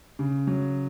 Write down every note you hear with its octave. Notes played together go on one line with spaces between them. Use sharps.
C#3
F#3